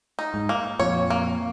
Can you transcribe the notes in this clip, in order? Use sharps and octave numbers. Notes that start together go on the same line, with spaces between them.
D#4
G#2
A#3
F2 A#2 C#5
A#3